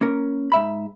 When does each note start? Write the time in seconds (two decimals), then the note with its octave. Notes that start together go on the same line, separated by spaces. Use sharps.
0.01 A#3 C#4 A#4
0.52 G#2 E5 B5